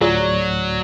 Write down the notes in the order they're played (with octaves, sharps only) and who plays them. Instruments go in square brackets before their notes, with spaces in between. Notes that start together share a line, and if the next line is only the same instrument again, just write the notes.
[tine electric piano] D2 A2 [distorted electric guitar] F#3 [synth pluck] F4 G#4 A#5 [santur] D5